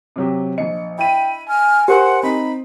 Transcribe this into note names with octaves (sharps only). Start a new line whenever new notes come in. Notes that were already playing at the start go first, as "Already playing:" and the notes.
C3 F#3 G4
A#1 D#5 C#7
E4 G5 B5 D#7
G#5 F6
G4 A#4 C5 F#5 G#5
C4 D#4 B5